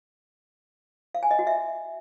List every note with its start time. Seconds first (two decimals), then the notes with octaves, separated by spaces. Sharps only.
1.15 F5
1.23 G#5
1.31 D#5
1.39 F#4
1.47 E5